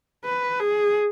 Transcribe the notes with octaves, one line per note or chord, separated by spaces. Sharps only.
B4
G#4